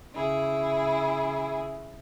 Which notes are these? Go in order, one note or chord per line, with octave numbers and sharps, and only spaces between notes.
C#3 E4 G#4